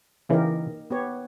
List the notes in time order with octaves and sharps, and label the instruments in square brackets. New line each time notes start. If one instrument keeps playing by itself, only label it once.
[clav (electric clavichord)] C#3 E3 [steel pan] A#3 D#4 G4 A#4
[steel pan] B3 G4 C#5